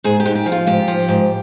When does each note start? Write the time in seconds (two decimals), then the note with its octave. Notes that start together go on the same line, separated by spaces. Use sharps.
0.04 G#2 G#4
0.20 G4
0.26 G#2
0.35 G4
0.46 F3
0.52 F4
0.67 G#2 G4
0.88 F3
1.08 G#2